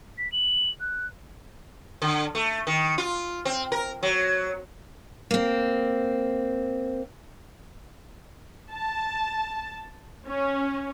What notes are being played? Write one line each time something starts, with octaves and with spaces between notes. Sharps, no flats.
B6
F#7
F#6
D3
A3
D#3
F4
C4
A#4
F#3
A#3 C4
A5
C#4